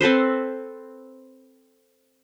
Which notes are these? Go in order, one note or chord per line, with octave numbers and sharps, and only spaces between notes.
C4 A4 B4 C5